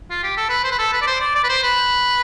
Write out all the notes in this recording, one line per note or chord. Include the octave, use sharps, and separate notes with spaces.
F4
G4
A4
B4
C5
B4
A4
B4
D5
C5
D5
D5
B4
C5
B4